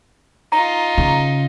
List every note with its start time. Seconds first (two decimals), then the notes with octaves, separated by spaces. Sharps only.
0.52 D#4 F4 A#5
0.98 C#3